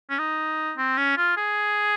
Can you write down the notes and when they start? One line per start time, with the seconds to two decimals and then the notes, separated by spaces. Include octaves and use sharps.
0.10 C#4
0.19 D#4
0.78 C4
0.98 C#4
1.17 F4
1.37 G#4